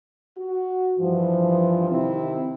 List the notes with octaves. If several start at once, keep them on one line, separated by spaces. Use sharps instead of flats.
F#4
G2 E3 F3
C3 D#3 C4 E4